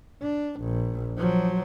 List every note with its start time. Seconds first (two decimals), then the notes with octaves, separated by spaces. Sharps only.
0.22 D4
0.60 A#1
1.17 F3 F#3